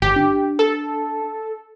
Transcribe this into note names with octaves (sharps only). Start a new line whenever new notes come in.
G1 G4
D4
A4